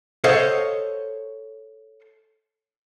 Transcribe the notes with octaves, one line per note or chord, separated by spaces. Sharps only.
A4 C5 C#5 D#5 F5 F#5